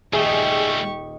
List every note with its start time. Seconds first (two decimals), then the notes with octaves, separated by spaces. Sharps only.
0.13 D#1 G3 A3 G4 G#4 D#5 E5 C#6